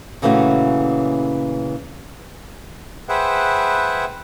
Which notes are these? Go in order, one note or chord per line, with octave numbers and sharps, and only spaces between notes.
A#2 C#3 E3 A3 C#4 F#4
G#4 B4 C5 E5 F#5 G5